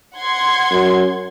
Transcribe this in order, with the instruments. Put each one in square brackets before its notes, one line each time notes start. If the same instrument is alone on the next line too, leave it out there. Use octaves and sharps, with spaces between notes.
[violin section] F#5 C6 G#6
[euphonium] F#2